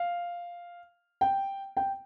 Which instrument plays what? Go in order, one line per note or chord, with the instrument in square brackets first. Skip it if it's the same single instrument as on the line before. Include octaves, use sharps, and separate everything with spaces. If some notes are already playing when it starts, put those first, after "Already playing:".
Already playing: [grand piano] F5
G5
G5